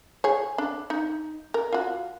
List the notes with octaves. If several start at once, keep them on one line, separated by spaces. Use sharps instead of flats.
G#4 C#5
D4
D#4
A#4
F4 F#4